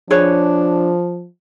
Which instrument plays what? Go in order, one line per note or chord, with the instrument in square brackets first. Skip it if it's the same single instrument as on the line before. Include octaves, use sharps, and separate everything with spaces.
[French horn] F3 [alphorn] D4 [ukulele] G#4 B4 C#5